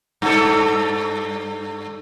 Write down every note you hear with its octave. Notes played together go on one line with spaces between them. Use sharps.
G2 A4